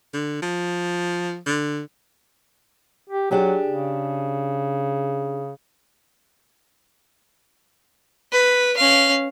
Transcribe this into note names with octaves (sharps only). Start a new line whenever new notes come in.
D3
F3
D3
G4
F#3 D4 G4 G#4
C#3
B4
C#4 F5